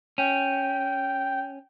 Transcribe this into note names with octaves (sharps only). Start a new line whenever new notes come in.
C#4 G5